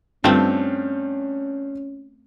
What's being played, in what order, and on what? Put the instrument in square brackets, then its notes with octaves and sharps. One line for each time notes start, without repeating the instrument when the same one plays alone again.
[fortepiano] G2 F4 G5 [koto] A3 C4 [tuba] C#4